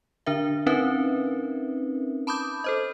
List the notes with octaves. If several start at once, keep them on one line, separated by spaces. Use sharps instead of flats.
D3 D4 A#4 E5
C4 C#4 D#4 A#4 B4 E5
A5 B5 D6 D#6 G6
A4 C5 D#5